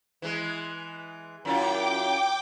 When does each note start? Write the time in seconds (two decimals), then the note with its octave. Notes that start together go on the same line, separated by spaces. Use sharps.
0.22 E3 G#3
1.45 F#2 E4 F4 G5 D6